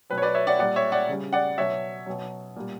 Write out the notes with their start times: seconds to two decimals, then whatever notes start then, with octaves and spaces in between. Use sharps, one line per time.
0.10 B2 F#3 B4
0.18 C#5
0.22 B4 D5
0.35 C#5 E5
0.47 D5 F#5
0.59 A#2 G3 D5 F#5
0.76 C#5 E5
0.92 D5 F#5
1.09 C#3 G3
1.33 D5 F#5
1.58 B2 F#3 C#5 E5
2.06 B2 F#3
2.56 A#2 G3